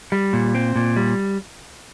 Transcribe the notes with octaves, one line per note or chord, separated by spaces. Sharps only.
G3
A#2
C4
A#2
G3